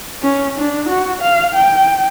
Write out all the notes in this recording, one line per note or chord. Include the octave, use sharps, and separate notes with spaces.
C#4
D4
F#4
F5
G5